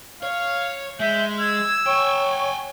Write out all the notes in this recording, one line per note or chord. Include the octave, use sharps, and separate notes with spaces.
C#5 F5
G#3 E5 G6
E6 G#6
C#5 G5 G#5